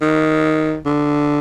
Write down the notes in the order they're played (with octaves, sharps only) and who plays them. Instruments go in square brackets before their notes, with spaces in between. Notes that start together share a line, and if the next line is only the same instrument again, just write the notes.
[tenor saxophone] D#3
D3